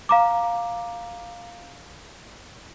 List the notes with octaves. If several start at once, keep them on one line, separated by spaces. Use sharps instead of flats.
F5 A#5 D6